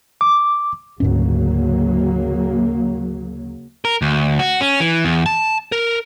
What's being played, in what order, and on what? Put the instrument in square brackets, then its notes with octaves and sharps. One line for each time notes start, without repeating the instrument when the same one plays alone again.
[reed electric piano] D6
[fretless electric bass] D2 G#2 C#4 [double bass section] C#3 F#3 A#3
[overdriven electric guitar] A#4
D2
F#4
C#4
E3
E2
A5
A#4